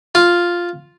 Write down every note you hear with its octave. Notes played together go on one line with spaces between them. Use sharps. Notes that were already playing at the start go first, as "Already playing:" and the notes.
F4